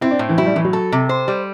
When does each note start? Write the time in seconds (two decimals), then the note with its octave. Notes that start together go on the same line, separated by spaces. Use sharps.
0.01 C4 E4
0.11 D4
0.19 A2
0.29 E3
0.38 F#3 E4
0.46 G3
0.56 A2 E3
0.64 F#3
0.73 A4
0.92 C3
1.09 C5
1.28 G3